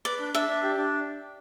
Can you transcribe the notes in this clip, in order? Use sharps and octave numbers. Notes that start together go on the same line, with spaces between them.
B4 D5
D4
D4 E5
D4
G4
D4